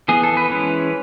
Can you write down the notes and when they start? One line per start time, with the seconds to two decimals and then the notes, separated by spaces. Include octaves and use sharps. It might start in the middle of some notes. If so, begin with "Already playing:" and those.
0.08 E3 B3 G#4
0.23 A4
0.37 B4
0.50 E3 G#3 C#4